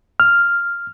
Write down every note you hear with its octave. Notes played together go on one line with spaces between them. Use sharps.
F6